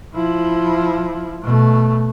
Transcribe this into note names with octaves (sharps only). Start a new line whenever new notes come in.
F3 E4
B2 A3